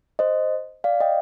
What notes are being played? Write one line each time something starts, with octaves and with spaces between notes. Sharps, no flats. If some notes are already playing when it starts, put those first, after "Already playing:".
C5 D#5
D5 F5
D#5 G5